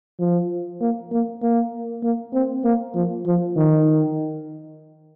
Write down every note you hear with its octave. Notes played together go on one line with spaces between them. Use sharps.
F3
A#3
A#3
A#3
A#3
C4
A#3
F3
F3
D#3